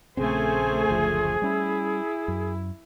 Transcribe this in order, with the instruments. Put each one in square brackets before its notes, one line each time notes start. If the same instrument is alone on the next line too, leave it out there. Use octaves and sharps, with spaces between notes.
[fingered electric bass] A#1 C#3 C4 [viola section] A3 C5 G#5 [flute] G#4
[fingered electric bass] F#1 D2 F3
[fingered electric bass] G3 C#4 [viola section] E4
[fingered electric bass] F#2